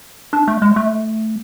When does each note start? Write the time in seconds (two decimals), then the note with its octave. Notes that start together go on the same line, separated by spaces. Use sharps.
0.33 D4
0.48 A3
0.62 G#3
0.76 A3